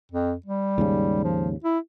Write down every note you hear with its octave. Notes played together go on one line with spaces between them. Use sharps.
F2
G3
D#2 G#2 C#3
F3
E4